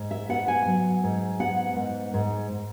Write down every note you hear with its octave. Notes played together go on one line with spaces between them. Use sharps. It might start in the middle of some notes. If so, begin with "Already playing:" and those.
Already playing: G#2
E5
B3 F#5
G#5
F#3
G#2
B3 F#5
G#2
G#2